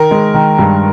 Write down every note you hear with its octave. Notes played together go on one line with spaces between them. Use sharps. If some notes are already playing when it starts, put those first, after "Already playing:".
Already playing: D#3 A#4
G#3
D#3
G2